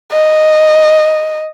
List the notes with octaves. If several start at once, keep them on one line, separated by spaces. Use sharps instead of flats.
D#5